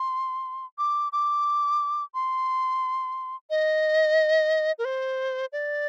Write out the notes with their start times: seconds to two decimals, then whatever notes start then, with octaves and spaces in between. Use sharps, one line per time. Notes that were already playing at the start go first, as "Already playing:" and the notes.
Already playing: C6
0.78 D6
1.12 D6
2.14 C6
3.50 D#5
4.79 A#4
4.85 C5
5.52 D5